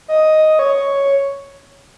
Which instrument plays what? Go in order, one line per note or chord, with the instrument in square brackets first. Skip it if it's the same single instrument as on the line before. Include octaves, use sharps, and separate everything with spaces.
[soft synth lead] D#5
C#5